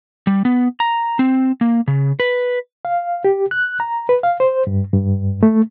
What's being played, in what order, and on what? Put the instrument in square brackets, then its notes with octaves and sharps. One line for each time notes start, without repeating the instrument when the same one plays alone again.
[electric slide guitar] G3
B3
A#5
C4
A#3
C#3
B4
[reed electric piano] F5
G4
F#6
A#5
B4
F5
C5
G2
G2
A3